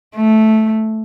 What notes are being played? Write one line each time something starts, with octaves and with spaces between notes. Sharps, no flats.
A3